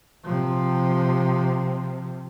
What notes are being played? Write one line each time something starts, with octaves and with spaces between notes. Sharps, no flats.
C3 F3